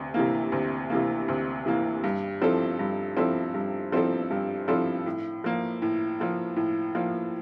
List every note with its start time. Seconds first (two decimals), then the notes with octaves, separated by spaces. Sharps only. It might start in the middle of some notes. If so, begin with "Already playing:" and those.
Already playing: D2 C3
0.14 C3 E3 A#3
0.52 D2
0.90 C3 E3 A#3
1.28 D2
1.66 C3 E3 A#3
2.04 G2
2.42 F3 C4 E4 A4
2.79 G2
3.17 F3 C4 E4 A4
3.54 G2
3.92 F3 C4 E4 A4
4.31 G2
4.68 F3 C4 E4 A4
5.06 A2
5.44 F3 A#3
5.82 A2
6.20 F3 A#3
6.56 A2
6.95 F3 A#3